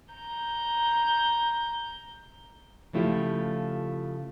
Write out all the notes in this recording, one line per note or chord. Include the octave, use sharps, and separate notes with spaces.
A#5 G6
C#3 F3 A3 E4 F4 G4